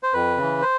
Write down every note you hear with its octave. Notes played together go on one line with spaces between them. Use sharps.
C5
F2 B4
C#3 E3
C5